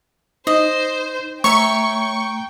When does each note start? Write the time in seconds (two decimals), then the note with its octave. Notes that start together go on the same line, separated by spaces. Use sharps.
0.47 D#4 C5 D#5
1.44 A3 C#5 E5 G5 A#5 C#6